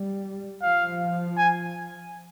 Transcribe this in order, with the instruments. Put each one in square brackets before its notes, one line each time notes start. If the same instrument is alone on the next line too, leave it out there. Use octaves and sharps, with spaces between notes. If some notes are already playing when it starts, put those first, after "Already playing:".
Already playing: [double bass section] G3
[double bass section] F3 [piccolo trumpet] F5
[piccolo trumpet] G#5